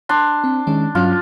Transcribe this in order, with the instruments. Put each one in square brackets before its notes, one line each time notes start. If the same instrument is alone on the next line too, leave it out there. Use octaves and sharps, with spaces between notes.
[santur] D4 C6
[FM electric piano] C4
D#3 G#3 C#4
[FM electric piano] G2 F#3 C#4 [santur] F4